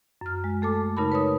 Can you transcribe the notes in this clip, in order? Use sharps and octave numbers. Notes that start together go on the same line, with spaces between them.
F#2 F6
G#3
A3 A4 A5 D6
C#3 D#4 A#4 A5 B5
B4 C#5 D#6